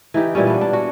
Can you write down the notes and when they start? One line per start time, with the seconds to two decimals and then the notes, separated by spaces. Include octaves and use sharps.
0.14 E3 D#4 G4
0.35 A#2 E3 G3 C#4
0.47 B3 D4
0.61 D4
0.73 F#4